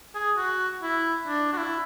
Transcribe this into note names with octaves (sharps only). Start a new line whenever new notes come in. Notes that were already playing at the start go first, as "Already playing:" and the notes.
G#4
F#4
E4
D4
F#4
E4